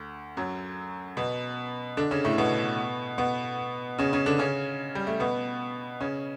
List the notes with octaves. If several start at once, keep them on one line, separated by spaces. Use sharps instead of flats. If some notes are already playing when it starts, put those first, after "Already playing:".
Already playing: D2
F#2 F#3
B2 B3
D3 D4
C#3 C#4
A2 A3
B2 B3
B2 B3
C#3 C#4
C#3 C#4
D3 D4
C#3 C#4
G3
A3
B2 B3
C#3 C#4